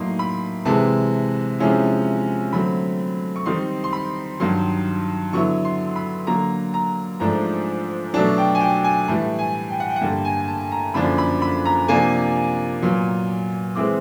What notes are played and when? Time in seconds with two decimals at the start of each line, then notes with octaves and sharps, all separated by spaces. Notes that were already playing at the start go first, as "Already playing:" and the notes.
Already playing: A2 F#3 A#3 D#4 C6
0.19 B5
0.65 C3 E3 G#3 A5
1.59 C3 F3 G#3 C#4 E4
2.53 D3 F#3 A3 C4 B5
3.36 C#6
3.46 D#3 G3 C4 D#4 C6
3.84 C6
3.93 B5
4.40 G2 D#3 F#3 C6
5.33 D3 F#3 B3 E4 C#6
5.65 C6
5.96 B5
6.27 D3 F#3 A#3 A#5
6.74 A#5
7.20 G#2 F3 A3 D4 A#5
8.14 B2 F#3 A3 D4 A5
8.38 G5
8.55 G#5
8.61 G5
8.84 G#5
9.08 A2 E3 G3 A5
9.39 G#5
9.70 G5
9.80 F#5
9.90 G5
9.96 F#5
10.01 G2 D3 G3 A#3 G5
10.25 G#5
10.48 A5
10.72 A#5
10.94 F#2 D3 F3 A#3 D4 B5
11.18 B5
11.42 B5
11.66 A#5
11.88 C3 F3 A#3 D4 G#5
12.82 A#2 F#3 B3
13.75 E3 G#3 C4 E4 D6